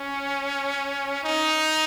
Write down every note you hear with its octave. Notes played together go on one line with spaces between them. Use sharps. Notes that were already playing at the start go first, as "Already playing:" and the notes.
Already playing: C#4
D#4